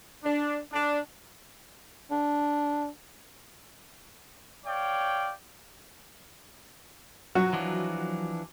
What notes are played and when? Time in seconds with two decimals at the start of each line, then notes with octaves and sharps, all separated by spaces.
0.24 D4
0.73 D4
2.11 D4
4.65 C#5 D5 F5 G5
7.35 F#3 F#4
7.53 E3 F3 D4